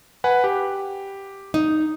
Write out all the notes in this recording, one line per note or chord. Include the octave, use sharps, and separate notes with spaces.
B4 F#5 G#5
G4
D#4